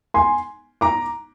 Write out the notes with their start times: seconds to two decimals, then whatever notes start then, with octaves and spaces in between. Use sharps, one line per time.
0.14 G#5 C6
0.81 A#5 D6